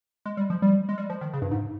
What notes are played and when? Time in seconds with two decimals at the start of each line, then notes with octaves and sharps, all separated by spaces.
0.26 G#3
0.37 G3
0.50 F3
0.62 G3
0.89 G#3
0.98 G3
1.10 F3
1.21 D#3
1.33 C#3
1.42 G2
1.51 G#2